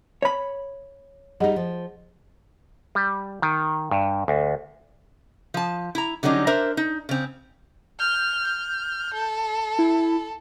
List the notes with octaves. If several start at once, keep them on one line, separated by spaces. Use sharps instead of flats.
C#5 B5
G3 D#4 G#4 D#5 F#5
F3
G3
D#3
G2
D2
F3 A5
E4 A#5
D3 F#3 G3 C#4 D#4
D4 A#4 C5 E5 A#5
D#4
C#3 C4
F6 G6
F6
A4
E4